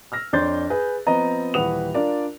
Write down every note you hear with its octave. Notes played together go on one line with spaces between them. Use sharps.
E6 F6 A#6
F2 D4 C#5 C6 G6 A6
G#4 B4
F3 B3 C4 D#5 A#5
D#1 E3 B4 F#5 D#6 F7
D4 F4 A#4 D5